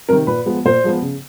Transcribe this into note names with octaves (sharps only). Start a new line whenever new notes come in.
C3 D#3 A#4
A#2 B4
F3 G#3 B3
A#2 C5
F3 G#3 B3
C#3